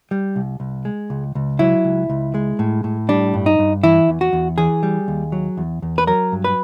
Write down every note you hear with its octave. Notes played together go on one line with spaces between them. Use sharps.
G3
C2
C2
G#3
C#2
C#2
F#3 E4
C#2
C#2
G#3
A2
A2
G3 D4
G2
D#4
G2
E3 E4
E2
F#4
E2
E3 G#4
G3
D#2
F#3
E2
E2
B4
F#3 A#4
G2
B4